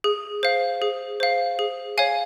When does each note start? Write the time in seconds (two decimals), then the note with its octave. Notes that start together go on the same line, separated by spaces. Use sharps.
0.04 G#4
0.43 C5 F5
0.82 G#4
1.20 C5 F5
1.59 G#4
1.98 C#5 F5 G#5